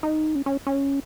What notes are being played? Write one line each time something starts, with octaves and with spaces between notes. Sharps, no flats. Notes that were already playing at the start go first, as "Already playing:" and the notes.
D#4
C#4
C#4
C#4